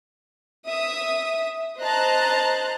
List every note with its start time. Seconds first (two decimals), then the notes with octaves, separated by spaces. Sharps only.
0.68 E5 D#6
1.80 C5 D#5 A5 A#5 F#6